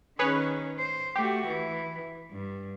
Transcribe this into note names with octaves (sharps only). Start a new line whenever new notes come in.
D#3 C#4 G#4 B4 C#5
C5
A3 F#4 G4
E3
G2